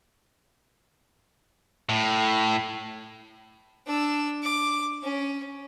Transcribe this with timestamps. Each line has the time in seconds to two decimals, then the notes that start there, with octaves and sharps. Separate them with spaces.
1.89 A2
3.87 D4 E6
4.42 D6
5.03 C#4